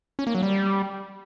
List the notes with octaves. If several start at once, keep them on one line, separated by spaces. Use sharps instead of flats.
C#4
A#3
F#3
G3